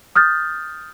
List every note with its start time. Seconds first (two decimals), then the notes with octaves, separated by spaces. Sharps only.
0.15 D#6 F6 G6 A6